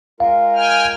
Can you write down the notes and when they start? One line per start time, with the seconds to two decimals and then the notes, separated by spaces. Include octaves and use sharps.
0.20 G#3 F4 A#4 F5
0.56 G5 G#5 F6